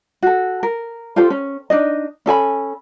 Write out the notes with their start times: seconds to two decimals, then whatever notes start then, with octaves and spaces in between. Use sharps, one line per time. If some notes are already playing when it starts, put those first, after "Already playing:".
0.23 F#4 A4
0.63 A#4
1.16 F4 G4 A4 C5
1.30 C#4
1.70 D4 D#4 D#5
2.26 C#4 A4 G#5 B5